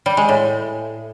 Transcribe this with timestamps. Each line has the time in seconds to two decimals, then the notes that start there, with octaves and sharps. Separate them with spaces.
0.06 G3
0.17 G#3
0.29 A2